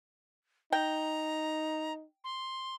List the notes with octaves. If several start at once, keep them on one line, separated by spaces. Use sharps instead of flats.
D#4 G5 A#5
C6